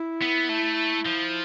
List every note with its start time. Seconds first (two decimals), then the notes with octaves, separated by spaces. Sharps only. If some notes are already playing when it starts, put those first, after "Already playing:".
Already playing: E4
0.22 B3
0.49 A3
1.05 F3